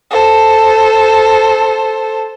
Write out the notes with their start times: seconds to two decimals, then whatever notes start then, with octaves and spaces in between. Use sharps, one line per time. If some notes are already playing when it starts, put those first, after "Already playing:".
0.11 A4 C5